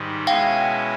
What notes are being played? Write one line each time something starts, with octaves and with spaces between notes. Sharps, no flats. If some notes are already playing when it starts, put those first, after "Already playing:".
Already playing: G#2 D#3 G3
B2 G#3 C#4 E4 F5 G5